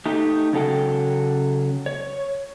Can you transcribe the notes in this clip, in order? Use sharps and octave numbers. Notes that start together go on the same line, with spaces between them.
A3 D#4 G4
C#3 F#3 A4 G5
C#5